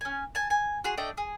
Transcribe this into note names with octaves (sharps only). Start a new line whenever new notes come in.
C#4 G#5
G#5 A5
G#5
F#4 G#4 C6
A3 D4 D#5 G5
G#4